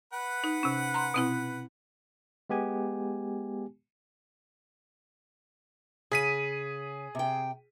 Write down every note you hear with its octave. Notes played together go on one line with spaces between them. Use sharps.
B4 F#5
D#4
C3 C#4
A#5 C6
B2 C4 E4
G#3 B3 G4 G#5
C#3 G#4 B6 D#7
C3 G5